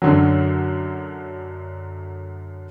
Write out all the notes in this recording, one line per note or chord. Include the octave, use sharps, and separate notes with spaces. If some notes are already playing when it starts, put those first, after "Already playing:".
F#2 D3 F#3